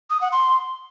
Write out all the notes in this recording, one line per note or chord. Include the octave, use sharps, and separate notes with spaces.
D#6
F#5
C6